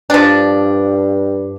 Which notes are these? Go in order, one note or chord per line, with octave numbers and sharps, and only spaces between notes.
G2 F3 D4